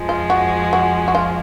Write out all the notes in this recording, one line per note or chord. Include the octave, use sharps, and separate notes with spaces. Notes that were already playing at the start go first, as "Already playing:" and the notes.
Already playing: F2 F3 G#3
F4
F#4
F#4
F#4
F4